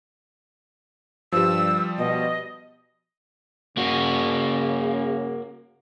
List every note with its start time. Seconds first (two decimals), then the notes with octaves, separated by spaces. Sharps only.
1.32 G2 F3 G3 E6
1.98 B2 D#5
3.77 C#3 A#3 F#4